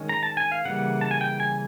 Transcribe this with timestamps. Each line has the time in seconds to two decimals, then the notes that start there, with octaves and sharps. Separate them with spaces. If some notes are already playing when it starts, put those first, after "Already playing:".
Already playing: D#3 G#3 C#4
0.09 A#5
0.23 A5
0.37 G#5
0.52 F5
0.65 C#3 E3 G3 A#3 F#5
1.01 A5
1.11 G#5
1.21 G5
1.40 G#5